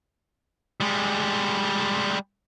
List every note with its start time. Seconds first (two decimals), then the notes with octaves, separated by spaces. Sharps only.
0.80 G3 G#3